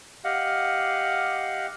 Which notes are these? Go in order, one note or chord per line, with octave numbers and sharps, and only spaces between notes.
G4 D#5 F5 F#5